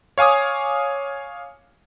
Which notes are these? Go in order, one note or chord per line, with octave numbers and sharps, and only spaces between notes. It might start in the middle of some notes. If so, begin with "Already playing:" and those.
C#5 F5 G#5 D6 D#6